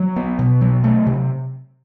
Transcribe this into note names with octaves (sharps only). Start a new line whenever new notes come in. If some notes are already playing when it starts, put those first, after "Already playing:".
Already playing: F#3
B3
B2
F#3
A3
C3